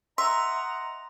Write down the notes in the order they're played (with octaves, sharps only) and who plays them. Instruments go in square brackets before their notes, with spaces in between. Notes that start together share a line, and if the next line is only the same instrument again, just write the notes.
[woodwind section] D#5 F#5 A#5 [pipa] E5 [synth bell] C6